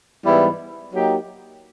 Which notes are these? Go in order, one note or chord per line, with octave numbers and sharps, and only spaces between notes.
G#2 E3 G3 B3 E4
F#3 A#3 D#4 G4